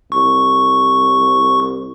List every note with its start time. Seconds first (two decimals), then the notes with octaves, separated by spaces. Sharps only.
0.12 C2 C#6